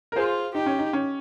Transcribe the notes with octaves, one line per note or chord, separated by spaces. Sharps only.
A#4
F4 G#4 C5
D#4 G4
C#4
D#4
C#4